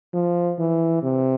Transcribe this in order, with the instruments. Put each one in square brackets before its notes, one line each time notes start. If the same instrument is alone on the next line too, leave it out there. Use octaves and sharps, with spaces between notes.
[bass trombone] F3
E3
C3